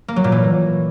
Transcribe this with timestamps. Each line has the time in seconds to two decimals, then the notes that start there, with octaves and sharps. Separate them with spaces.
0.08 A#3
0.16 F#3
0.24 A#2
0.32 E3